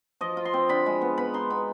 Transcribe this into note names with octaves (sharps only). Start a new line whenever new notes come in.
F3 D#5
F4
C6
C4
D3 B5
G#3
B3
B3 B5
D#4 C6
B3 B5